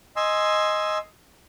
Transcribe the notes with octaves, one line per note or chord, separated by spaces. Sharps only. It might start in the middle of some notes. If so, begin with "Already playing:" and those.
D#5 G#5 C6 E6